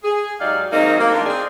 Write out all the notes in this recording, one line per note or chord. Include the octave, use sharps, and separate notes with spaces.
G#4
G#2 F#3 D#4 G4 D5 F5
D#3 F#3 G#3 A#3 C4 D#4
A#3
A2 F3 D4 F4
C4 G#4 D5